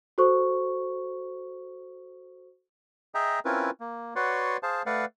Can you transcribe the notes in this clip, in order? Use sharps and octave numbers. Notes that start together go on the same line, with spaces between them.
F#4 A4 C5 C#6
G#4 D#5 E5 G5 A#5
C4 C#4 E4 F4 A#4 B4
A#3
F#4 B4 C#5 D5 F#5 C6
G#4 C5 F5 A5
A3 B4 D5 F5 F#5